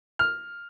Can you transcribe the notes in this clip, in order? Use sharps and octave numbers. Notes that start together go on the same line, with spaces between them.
F6